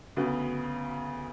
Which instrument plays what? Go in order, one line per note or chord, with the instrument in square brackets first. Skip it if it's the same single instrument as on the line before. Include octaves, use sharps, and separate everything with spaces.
[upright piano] D2 C#3 F#3 B3